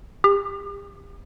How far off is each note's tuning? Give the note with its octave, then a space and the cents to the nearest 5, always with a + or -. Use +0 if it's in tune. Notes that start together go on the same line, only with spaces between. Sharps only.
G4 +40